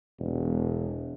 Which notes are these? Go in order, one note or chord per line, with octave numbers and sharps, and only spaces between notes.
E1